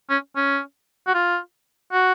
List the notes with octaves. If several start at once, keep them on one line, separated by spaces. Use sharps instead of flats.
C#4
C#4
F#4
F4
F#4